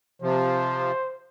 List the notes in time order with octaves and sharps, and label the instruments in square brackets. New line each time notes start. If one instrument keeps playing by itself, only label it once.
[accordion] C3 F3 [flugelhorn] C5